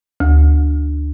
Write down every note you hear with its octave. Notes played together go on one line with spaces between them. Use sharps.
D2